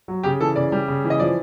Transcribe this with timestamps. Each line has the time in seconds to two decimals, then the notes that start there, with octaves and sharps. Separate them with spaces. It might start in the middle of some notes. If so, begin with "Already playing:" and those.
0.08 F#3
0.23 C#3 G4
0.41 E3 A4
0.56 C#3 D5
0.72 G3
0.88 C#3
1.05 E3
1.10 D#5
1.20 F3 D5